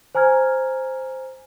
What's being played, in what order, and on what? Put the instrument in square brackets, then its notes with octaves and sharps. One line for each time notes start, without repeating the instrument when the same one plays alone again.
[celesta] C5 G#5 A#5 F6 G#6